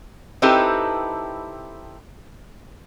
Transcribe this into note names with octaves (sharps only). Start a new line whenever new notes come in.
C4 D#4 E4 G4 A4 B4